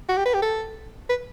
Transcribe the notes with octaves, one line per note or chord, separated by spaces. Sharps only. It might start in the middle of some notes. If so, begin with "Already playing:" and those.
F#4
G4
B4
G4
A4
B4